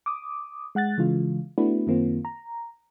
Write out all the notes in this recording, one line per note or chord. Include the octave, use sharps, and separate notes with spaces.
D6 D#6
G#3 F#5 F#6 A6
C#3 E3 G#3 F4
A3 B3 D4 E4 F#4 B4
F#2 D#3 A#3 C4 F4
A#5